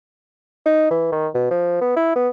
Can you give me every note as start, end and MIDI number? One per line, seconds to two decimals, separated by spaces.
0.66 0.87 63
0.91 1.07 52
1.12 1.28 51
1.35 1.46 47
1.51 1.79 53
1.81 1.92 59
1.96 2.15 64
2.16 2.29 59